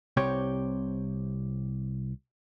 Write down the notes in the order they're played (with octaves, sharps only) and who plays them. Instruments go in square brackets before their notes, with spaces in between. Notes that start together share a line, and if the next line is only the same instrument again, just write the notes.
[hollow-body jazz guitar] C2 C3 G4 C#5